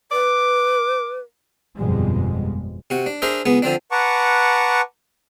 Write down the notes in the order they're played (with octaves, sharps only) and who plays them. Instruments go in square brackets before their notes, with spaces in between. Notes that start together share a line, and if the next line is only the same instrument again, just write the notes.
[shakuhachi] B4 [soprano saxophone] D6
[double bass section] G1 F2 B2 G3 G#3
[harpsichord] C3 F#4
D4
D4 G#4 A#4 C5 E5
C#2 B3 G#4
D3 F3 C4 D4
[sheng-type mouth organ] B4 F#5 A5 A#5 C#6 D6